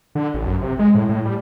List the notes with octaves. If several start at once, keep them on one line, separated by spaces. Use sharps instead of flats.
D3
A1
F#2
C3
G#3
A2
A2
G3